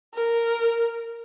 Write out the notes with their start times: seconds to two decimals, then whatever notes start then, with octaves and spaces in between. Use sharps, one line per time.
0.14 A#4